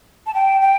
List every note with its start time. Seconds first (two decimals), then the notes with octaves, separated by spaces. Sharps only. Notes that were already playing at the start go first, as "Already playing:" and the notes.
0.27 A5
0.34 G5
0.61 G5